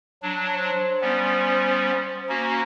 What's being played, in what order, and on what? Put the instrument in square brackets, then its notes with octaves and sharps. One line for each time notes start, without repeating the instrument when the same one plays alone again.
[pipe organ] F#3 D4
[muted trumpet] C5
[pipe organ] G3 B3 C#4
[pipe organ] A#3 C#4 F#4 [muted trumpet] A#5